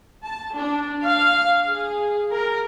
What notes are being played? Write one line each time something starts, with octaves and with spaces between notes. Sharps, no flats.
A5
D4
F5
G#4
A#4